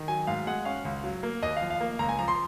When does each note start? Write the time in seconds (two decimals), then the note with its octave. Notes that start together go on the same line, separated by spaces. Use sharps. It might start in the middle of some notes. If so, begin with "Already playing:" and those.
Already playing: D#3
0.08 F#3 G#5
0.27 G#2 F5
0.47 G#3 F#5
0.65 C#4 F5
0.85 C#2
1.04 F#3
1.23 A#3
1.43 D#2 D#5
1.56 F5
1.61 F3
1.70 F5
1.81 A#3
1.99 C#2 A#5
2.09 G#5
2.19 F3 A#5
2.28 C6